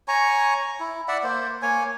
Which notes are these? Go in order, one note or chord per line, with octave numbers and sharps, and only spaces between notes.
C#5 G#5 A#5 C#6
E4
D5 E5 F#5
A#3 C5
A#3 C#5 G#5